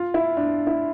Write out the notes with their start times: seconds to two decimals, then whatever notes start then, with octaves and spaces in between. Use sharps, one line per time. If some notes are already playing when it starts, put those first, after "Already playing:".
Already playing: F4
0.14 E4
0.37 D4
0.67 E4